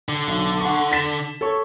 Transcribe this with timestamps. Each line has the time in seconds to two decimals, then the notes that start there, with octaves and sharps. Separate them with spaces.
0.09 D3
0.27 B1
0.61 F#5 C#6
0.92 A6 B6 E7
1.41 A4 C#5 C#6